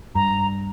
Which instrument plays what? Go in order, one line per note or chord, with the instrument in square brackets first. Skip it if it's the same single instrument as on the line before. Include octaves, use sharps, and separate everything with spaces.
[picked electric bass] G2 [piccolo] A#5